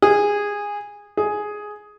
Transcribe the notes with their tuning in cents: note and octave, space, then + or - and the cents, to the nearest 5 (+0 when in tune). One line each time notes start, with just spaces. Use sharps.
G#4 -15
G#4 +5